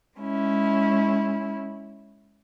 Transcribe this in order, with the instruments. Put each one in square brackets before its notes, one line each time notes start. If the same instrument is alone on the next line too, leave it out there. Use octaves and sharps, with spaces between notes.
[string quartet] G#3 C#4 E4